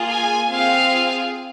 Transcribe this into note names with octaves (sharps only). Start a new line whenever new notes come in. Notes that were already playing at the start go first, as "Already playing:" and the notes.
Already playing: A#3 F4 G#4
G#5
C4 F4 G#4 F5